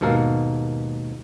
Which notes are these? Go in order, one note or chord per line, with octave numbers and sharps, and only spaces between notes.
D#2 G#2 B2 A4 A#4 F5